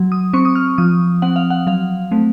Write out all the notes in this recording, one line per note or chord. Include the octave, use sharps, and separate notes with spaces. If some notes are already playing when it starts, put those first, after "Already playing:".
Already playing: F#3
D#6
C4 C#6
D#6
F6
F3 D#6
C4 F#5
F5
F#5
F#3 F5
A3 C4